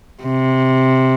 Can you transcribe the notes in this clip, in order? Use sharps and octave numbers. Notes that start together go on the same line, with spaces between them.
C3